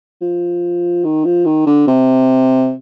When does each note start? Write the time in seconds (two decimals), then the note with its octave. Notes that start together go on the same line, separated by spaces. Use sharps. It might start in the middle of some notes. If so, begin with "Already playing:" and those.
0.22 F3
1.04 D#3
1.25 F3
1.46 D#3
1.66 D3
1.88 C3